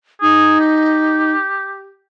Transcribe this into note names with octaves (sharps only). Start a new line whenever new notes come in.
D#4 G#4
G4